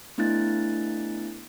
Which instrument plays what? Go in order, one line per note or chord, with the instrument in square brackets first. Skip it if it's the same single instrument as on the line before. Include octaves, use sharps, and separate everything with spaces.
[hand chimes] A3 B3 D4 E4 F#6 A6